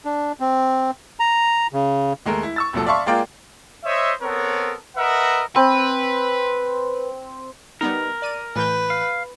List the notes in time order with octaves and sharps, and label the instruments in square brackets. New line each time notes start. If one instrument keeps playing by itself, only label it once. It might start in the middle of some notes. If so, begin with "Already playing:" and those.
[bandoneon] D4
C4
A#5
C#3
[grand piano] D#2 G#3 A3 A#4
E4
C#6 E6 A6
F1 A#2 F#3 A4
D5 E5 F5 A5 C6 C#6
G#3 A#3 F4 A#4 D5 G5
[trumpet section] C5 C#5 D#5 E5
B3 C4 A4 A#4 C#5
A#4 B4 D#5 E5 F#5
[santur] C4 [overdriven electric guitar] B4
[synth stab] G3 B3 D#4 [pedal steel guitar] A#4
[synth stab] D5 D#7
[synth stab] A2 E3 G6 [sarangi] B4
[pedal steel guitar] F5